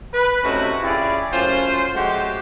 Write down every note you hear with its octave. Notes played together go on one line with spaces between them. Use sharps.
B4
C3 A3 C#4 D#4 E4 F#4
C#4 E4 F4 G4 G#4 D5
F#2 A2 C#4 F4 C5
F#3 G#3 A3 F#4 G4 C5